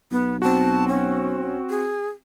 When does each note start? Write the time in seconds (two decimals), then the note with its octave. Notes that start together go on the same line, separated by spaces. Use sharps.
0.12 B1 B3
0.42 C4 F#4 A5
0.88 C#4
1.70 G#4